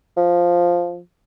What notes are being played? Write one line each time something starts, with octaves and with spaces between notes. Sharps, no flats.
F3